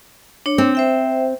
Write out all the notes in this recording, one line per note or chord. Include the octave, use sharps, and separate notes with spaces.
D4 C#5
C4
C5 E5 G5